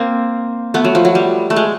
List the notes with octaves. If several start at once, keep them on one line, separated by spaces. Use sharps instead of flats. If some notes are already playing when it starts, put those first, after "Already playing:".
Already playing: A#3 C4
A3 B3
F#3
F3
F#3
G3
A3
G#3